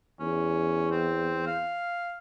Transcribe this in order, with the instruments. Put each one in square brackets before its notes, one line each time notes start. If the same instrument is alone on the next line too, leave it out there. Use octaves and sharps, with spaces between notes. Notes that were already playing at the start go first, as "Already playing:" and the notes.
[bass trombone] E2 [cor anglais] C#4
[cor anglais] C4
F5